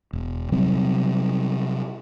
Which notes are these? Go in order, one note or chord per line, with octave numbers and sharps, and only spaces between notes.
E1
C3 F#3 G3 C4